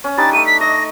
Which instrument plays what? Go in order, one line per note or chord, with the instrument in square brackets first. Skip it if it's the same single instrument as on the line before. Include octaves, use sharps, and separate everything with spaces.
[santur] C#4
[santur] G3 D4 D#4 [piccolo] A6
[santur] A3 A5 [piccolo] D#7
[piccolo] B6
[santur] D#5 [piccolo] A#6